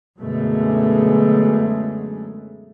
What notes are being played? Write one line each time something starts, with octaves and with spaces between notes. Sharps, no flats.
F#2 B2 D3 G#3 A3